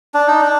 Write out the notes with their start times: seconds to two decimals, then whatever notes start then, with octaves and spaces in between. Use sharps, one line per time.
0.14 D4
0.28 D#4
0.41 D4